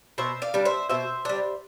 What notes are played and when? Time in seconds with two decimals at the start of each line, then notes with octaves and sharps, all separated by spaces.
0.18 B2 C5 E5
0.42 D5 F5
0.54 G3 D4
0.65 C5 E5
0.89 B2 C5 E5
1.25 G3 D4